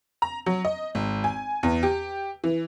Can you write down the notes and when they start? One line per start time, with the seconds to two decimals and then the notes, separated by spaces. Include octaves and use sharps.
0.22 A#5
0.46 F#3
0.65 D#5
0.95 G#1
1.24 G#5
1.63 E2
1.83 G4
2.44 E3